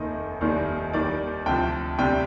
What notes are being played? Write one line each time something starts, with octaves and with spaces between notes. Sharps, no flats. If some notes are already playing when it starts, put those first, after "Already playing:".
Already playing: F1 D#2 D#3 D#5
F1 D#2 D#3 G3
D#2 D#3 G3 D5
D2 C3 F3 G5
D2 C3 G3 G5